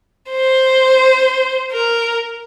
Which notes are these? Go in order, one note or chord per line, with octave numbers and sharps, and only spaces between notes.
C5
A#4